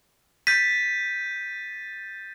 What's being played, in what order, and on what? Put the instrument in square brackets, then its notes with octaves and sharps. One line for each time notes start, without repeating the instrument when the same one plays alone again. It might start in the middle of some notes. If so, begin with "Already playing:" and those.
[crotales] G6 A6 D#7 [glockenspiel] B6